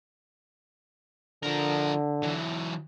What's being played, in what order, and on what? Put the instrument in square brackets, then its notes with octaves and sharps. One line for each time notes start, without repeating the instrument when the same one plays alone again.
[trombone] D3 [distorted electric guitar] F3 A#4
[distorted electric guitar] E3 F#3